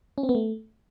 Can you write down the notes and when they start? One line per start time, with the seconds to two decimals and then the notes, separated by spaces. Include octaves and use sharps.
0.18 C#4
0.23 C4
0.29 B3
0.35 A3